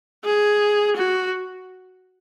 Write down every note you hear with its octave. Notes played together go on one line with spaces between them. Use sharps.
G#4
F#4